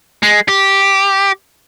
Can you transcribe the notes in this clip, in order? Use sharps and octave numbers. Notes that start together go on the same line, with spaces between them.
G#3
G4